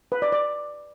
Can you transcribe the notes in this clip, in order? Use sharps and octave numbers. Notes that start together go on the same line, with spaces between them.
B4
D5
D5